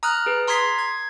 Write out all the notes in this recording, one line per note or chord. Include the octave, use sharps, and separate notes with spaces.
A#5 D#6 F6 F#6
G#4 B4
A#5 C6 D#6 G#6 B6 C7
G#6